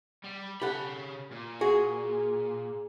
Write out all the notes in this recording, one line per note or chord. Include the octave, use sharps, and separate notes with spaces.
G3
C#3 G4 A4 F#5 B5
A#2
F#4 G#4